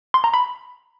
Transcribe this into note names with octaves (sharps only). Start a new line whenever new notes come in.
C6
A#5
B5